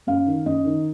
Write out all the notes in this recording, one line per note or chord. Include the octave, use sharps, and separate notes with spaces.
F#2 F5
D#3
F#2 D#5
D#3